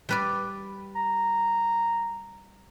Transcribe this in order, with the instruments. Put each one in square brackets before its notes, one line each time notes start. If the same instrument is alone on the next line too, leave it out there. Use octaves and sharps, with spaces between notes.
[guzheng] G3 B4 D5
[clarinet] A#5